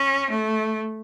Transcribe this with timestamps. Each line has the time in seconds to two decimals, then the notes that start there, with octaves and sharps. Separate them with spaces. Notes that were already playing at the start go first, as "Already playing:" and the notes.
Already playing: C#4
0.30 A3